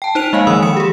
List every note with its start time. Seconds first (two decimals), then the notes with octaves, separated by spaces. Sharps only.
0.02 G5 A5
0.15 D#4 C5 D7 F7
0.33 G#3 A#3 D#5 F5 G#5
0.47 D#3 F3 G#3 B5 D#6 E6
0.62 E3 B5 D#6 C#7 E7
0.77 G4 G#4